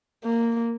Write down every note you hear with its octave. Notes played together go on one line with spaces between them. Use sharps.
A#3